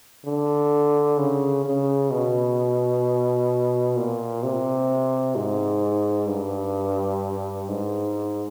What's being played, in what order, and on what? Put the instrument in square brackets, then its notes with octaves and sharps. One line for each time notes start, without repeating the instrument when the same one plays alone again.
[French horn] D3
C#3
C#3
B2
A#2
C3
G#2
G2
G#2